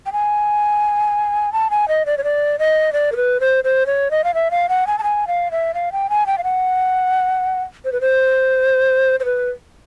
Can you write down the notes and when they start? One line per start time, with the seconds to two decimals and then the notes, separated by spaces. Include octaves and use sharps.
0.06 G5
0.13 G#5
1.53 A5
1.70 G#5
1.88 D#5
2.06 D5
2.18 C#5
2.24 D5
2.59 D#5
2.93 D5
3.12 A#4
3.16 B4
3.40 C5
3.64 C5
3.86 C#5
4.11 D#5
4.24 F5
4.34 E5
4.51 F5
4.69 F#5
4.87 G#5
4.99 A5
5.03 G#5
5.27 F5
5.51 E5
5.74 F5
5.92 G5
6.10 G#5
6.27 G5
6.38 F5
6.44 F#5
7.85 C5
7.92 B4
8.01 C5
9.20 C5
9.25 B4